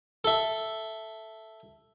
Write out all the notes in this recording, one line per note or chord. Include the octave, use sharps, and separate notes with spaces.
A4 E5